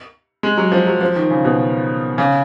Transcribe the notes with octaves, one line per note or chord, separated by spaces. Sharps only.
G#3
F#3
F3
F#3
F3
D#3
C#3
B2
C#3